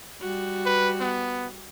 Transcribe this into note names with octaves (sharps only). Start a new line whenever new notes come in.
G3 F#4
B4
B3